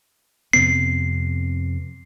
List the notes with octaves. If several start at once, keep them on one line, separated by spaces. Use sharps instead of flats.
F2 C3 B3 C7